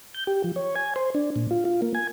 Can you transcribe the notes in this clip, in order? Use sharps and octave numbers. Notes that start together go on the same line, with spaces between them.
G6
G4
F3
C#5
G#5
C5
D4
A#2
F4
F4
A#3
G#5